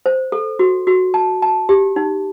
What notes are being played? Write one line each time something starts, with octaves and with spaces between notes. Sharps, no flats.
C5
A4
F#4
F#4
A5
A5
G4
D#4